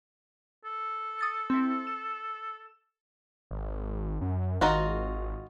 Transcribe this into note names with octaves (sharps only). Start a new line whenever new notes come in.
A4
D#6 A6 C#7
C4 E4
E7
G#1
F#2
G#1 D#4 F4 F#4